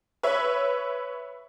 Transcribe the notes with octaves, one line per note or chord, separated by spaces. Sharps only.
B4 C#5 E5